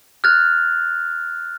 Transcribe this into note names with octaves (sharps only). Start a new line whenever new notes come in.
F6 F#6 G#6 A6 F7